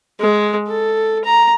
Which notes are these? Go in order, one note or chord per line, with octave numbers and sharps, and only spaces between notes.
G#3
A4
A#5